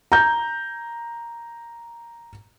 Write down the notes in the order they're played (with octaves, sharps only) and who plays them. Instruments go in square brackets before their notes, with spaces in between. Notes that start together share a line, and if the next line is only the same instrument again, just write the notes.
[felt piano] A#5 G6